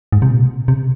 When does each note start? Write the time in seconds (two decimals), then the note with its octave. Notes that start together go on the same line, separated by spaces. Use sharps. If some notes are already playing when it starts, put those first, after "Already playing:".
0.12 G#2
0.22 C3
0.30 A#2
0.68 C3